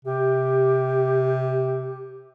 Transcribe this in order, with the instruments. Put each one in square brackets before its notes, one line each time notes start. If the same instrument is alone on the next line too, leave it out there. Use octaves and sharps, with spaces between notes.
[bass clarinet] C3 [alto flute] G4